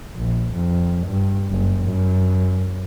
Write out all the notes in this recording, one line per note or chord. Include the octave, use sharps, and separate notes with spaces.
A#1
F2
G2
F#1
F#2